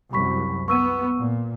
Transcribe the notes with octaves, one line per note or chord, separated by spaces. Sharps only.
C2 F#2 B5 C#6 B6
B3 C#6 E6 D#7
A#2